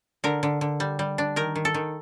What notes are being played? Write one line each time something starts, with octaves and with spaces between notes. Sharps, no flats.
D3 A#4
D3
D3
G3
G3
D4
D#3 A#4
D#3
A4
D#3